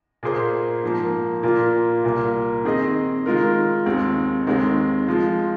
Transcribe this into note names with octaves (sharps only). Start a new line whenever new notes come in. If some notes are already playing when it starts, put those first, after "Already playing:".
A#2 A#3 G#4 C5
G#2 F3 A#3
A#2 A#3 F4 A#4
C2 A#2 A#3
D#3 C4 G#4 D#5
D#3 G#3 F4 A#4
D#2 D#3 G#3 C4
D#2 D#3 G#3 C4 G#4
F3 G#3 F4